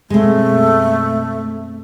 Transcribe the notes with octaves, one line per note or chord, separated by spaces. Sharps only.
F#2 B2 G#3 A3 C4